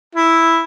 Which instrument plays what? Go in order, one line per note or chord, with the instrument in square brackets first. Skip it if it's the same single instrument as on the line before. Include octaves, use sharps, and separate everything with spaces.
[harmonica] E4